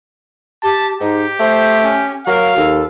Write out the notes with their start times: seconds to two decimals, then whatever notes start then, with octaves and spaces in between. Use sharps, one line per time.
0.63 G4 A5
1.01 G#2 D#4 G4
1.40 A3 C5
1.83 C#4
2.27 F#3 A#4 F5
2.57 D#2 A4